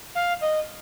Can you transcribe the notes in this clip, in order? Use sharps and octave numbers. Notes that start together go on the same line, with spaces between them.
F5
D#5